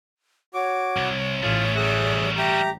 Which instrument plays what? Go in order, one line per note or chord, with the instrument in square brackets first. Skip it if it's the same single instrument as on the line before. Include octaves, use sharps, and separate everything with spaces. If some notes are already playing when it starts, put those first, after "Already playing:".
[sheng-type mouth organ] F#4 D6 [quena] C#5
[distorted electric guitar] C2
[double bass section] A1 [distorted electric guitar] A3 G#4 [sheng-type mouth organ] F4
[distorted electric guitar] G3 F#4 [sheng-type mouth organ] G#4 E5 F#6
[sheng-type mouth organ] G4 A#5 [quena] E5